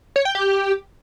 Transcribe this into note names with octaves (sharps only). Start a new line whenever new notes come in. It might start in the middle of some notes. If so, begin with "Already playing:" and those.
C#5
G5
G4